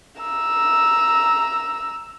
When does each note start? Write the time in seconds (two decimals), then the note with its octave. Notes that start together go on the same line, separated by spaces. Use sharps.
0.21 A#5 E6